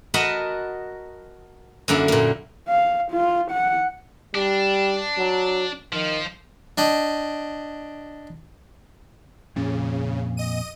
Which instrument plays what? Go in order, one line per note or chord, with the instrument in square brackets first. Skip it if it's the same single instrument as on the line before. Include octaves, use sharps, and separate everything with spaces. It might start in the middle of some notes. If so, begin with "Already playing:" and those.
[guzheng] F#4 A#4 D#5 F#5 A5 B5
F#2 D3 A#3 E4
A#2 A#3
[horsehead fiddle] F5
F4
F#5
[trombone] G3 [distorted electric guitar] D4
[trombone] F#3
[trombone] D#3 [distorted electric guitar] F3
[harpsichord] D4 D#5 G5
[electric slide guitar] F2 A#2 [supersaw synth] C#3
[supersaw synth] D#5 D#7